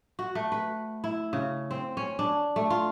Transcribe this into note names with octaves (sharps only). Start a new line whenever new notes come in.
F#4
A3
B4
E4
C#3
C4
C#4
D4
A3
F4